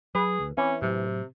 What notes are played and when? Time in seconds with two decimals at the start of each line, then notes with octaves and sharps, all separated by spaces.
0.15 F#3 G#4 B4
0.40 D2
0.57 E3 C4 C#4
0.82 A2 C3 F#3